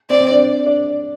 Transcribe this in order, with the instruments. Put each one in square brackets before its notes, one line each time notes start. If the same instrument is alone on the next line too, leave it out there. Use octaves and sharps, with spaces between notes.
[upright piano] C4 [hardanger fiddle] D5
[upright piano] C4
D4
D4